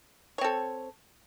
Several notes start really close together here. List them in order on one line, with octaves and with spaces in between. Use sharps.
C#5 C4 A4